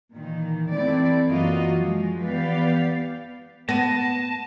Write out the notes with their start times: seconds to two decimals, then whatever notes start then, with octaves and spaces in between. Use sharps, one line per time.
0.13 A#2 D#3 E3
0.72 E3 A3 C4 E4 D5
1.28 F#2 E3 A#3 F4 F#4 D#5
1.77 F3 G#3
2.24 E3 B3 G4 B4 D5 F5
3.69 B3 A5 A#6 D#7